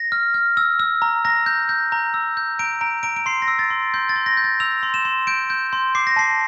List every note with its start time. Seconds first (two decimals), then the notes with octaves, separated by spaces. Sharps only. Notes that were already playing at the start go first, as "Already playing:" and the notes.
Already playing: A#6
0.12 F6
0.34 F6
0.57 E6
0.80 E6
1.02 A#5
1.25 A#5 A#6
1.46 G6
1.69 G6
1.92 A#5
2.14 E6
2.37 G6
2.59 A#5 D7
2.81 A#5 D7
3.03 A#5 D7
3.16 D7
3.26 C6 C7
3.42 A#6
3.48 E6
3.59 A6
3.70 C6
3.94 C6 G6
4.09 A6
4.16 C6
4.26 A#6
4.37 G6
4.44 A6
4.60 E6 F7
4.83 C6
4.94 E7
5.05 C6
5.27 G6 D7
5.50 G6
5.73 C6
5.95 D6 C7
6.07 A#6
6.16 A5 C7